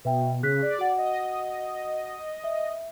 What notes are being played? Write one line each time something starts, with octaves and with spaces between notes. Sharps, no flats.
B2 B4 E5 G5
C#3 G#4 F#6 B6
D5
F#4 F#5
D#5
E5